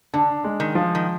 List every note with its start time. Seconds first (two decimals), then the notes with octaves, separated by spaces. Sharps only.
0.14 D3 D4
0.44 G#3
0.60 D#3
0.75 F3
0.95 D#3